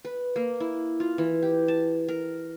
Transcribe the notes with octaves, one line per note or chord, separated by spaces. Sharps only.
B4
A#3
E4
F4
E3
G4
A5
A#4